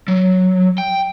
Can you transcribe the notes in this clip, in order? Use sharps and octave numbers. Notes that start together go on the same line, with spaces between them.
F#3
G5